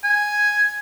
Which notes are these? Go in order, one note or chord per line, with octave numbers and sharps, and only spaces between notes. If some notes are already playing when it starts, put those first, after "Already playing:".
G#5